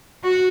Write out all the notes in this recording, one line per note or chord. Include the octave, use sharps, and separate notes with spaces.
F#4